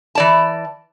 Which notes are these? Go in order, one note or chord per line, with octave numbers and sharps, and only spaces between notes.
E3 D5 A5